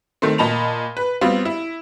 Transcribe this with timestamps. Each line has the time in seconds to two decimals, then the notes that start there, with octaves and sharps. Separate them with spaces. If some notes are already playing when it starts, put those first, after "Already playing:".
0.22 D#3 A3 C4
0.38 A#2 D#5 A5 B5 F7
0.97 B4
1.21 G3 B3 C4 F4
1.45 E4